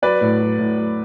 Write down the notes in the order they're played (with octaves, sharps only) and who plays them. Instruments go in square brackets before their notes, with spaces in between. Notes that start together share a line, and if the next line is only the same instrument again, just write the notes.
[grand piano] F#3 B4 D5
A2
F#3
A2
F#3